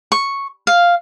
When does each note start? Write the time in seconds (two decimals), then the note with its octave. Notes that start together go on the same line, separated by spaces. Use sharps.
0.12 C#6
0.67 F5